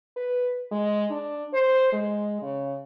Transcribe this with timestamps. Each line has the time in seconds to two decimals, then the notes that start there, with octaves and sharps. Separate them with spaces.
0.16 B4
0.71 G#3
1.10 D4
1.53 C5
1.92 G#3
2.42 C#3